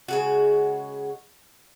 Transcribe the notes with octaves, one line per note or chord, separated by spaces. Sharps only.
C#3 G#3 F#4